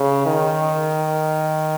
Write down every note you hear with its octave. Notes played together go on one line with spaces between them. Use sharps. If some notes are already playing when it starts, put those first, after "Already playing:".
Already playing: C#3
D#3